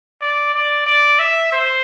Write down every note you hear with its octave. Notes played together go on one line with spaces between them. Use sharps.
D5
D5
D5
E5
C5